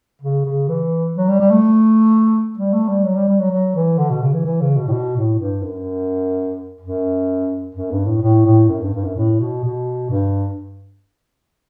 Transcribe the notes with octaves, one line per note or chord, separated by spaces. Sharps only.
C#3
C#3
E3
F#3
G3
G3
A3
G3
A3
G3
F#3
G3
G3
F#3
F#3
E3
D3
B2
C#3
E3
E3
C#3
B2
A2
B2
A2
G2
F#2
F#2
F#2
G2
A2
A2
A2
F#2
G2
G2
F#2
A2
B2
B2
G2